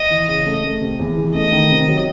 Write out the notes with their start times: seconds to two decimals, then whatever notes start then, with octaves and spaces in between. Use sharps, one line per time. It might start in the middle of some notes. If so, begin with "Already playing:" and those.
Already playing: D#5
0.10 E3
0.27 C#3
0.46 A3
0.64 A3
0.81 C3
0.99 E2
1.16 E3
1.34 A3 D#5
1.52 D#3
1.70 C3
1.88 F#3